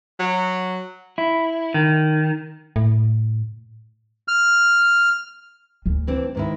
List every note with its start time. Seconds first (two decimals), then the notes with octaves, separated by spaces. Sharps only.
0.19 F#3
1.18 E4
1.74 D#3
2.76 A2
4.28 F6
5.86 D2
6.07 E3 C4 D4
6.35 G#2 D#3 E4